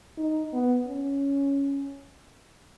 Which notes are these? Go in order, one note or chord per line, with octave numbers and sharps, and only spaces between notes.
D#4
B3
C#4